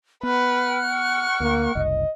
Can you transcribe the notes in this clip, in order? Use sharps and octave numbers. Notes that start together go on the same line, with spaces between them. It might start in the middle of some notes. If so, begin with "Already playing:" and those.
B3 B4 F#5 F6 F#6
C#6
D2 A#3
F#1 C2 D#5